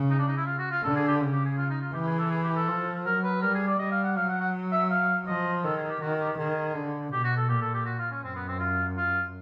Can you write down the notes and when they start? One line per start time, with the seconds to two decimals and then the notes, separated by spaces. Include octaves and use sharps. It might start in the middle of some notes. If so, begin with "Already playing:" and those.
Already playing: C#3
0.10 D#4
0.19 D4
0.28 D#4
0.37 E4
0.46 F4
0.58 F#4
0.71 F4
0.83 D3 A4
0.96 G#4
1.08 G4
1.21 C#3
1.32 G4
1.45 G#4
1.58 F4
1.70 D#4
1.82 F4
1.94 E3 G4
2.07 G#4
2.18 A4
2.31 G#4
2.44 G4
2.56 A4
2.68 F3
3.05 F#3 A#4
3.24 B4
3.42 G3 A#4
3.54 G#4
3.67 D5
3.79 G3 D#5
3.91 F5
4.04 F#5
4.16 F#3 F5
4.29 F#5
4.41 F#5
4.72 E5
4.90 F5
5.27 F3 D#5
5.64 D#3 A4
5.77 G#4
5.89 G4
6.01 D#3 F#4
6.20 G4
6.38 D#3 G#4
6.75 D3
7.12 B2 G4
7.24 F#4
7.37 A4
7.49 A#2 G4
7.61 A4
7.74 G4
7.86 F#4
7.98 F4
8.11 C#4
8.23 F#2 C4
8.36 B3
8.48 C4
8.60 F4
8.97 F4